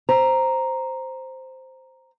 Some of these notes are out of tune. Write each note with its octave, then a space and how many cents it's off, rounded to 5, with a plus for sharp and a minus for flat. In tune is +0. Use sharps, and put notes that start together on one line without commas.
C5 +0 A#5 +0